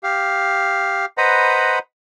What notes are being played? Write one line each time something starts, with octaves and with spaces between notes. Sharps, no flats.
G4 F5
B4 C5 D#5 F#5 A#5 B5